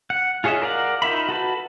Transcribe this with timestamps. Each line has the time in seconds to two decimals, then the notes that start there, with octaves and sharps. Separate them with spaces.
0.10 F#5
0.44 F4 G#4 C#5 D#5 E5
0.62 A#4 D5 F5 F#5
1.02 D#4 F4 E5 B5
1.29 F#4 A4 B4